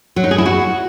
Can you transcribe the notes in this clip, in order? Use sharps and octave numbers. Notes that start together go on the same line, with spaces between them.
F#3
D#4
G#4
E4
F#4